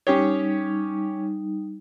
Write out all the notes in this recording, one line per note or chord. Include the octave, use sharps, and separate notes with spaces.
G3 C#4 D#4 G4 C#5